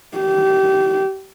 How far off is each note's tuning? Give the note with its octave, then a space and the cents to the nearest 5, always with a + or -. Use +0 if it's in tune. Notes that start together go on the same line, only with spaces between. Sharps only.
G4 -25